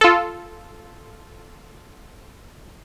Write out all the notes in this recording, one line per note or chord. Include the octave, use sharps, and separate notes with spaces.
F4 A4